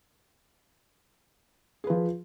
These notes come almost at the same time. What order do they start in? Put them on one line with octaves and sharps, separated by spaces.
G#4 B4 F3